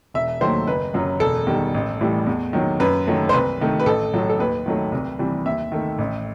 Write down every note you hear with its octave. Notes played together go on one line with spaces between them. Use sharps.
E1 E5
D#2 D#3 F#3 A3 C5
F#1 B4
F#2 F#3
E1 A4
E2 D#3 G3
A1
A2 E3 G3
E2
D#3 F#3
F#2 B4
D#3 F#3 A3
C5
C2 B4
C3 D#3 A3
B4
A1 A4
A2 F#3 A3
A4
D#2 B4
D#3 F#3 A3
C2
C3 E3 G3
D#2 E5
D#3 A3
A1